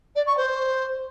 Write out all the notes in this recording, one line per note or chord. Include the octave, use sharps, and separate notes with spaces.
D5
C#6
C5